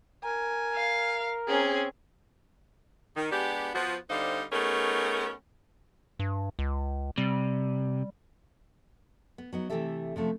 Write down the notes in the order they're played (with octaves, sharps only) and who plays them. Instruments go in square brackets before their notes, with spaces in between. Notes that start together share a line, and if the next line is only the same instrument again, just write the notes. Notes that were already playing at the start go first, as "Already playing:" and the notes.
[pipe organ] A#4 [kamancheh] G#5
[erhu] F5
[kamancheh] C4 C#4 [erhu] G#4
[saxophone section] D#3
G#3 B3 D4 G4
F3 B3 F#4
D3 G3 C4 D#4 C5 F5
A3 B3 C#4 D#4 G#4 A#4
[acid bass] G2
C#2
[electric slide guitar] C3 [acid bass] G3
[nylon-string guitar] B3
F#3 B3 D#4
C3 E3 A3 G4 A4 E5
C3 F3 A3 C#4